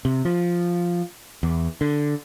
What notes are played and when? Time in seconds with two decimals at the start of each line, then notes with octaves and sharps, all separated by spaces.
0.05 C3
0.25 F3
1.43 E2
1.81 D3